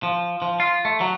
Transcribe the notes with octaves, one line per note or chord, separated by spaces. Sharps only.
F3
F3
F4
A3
F#3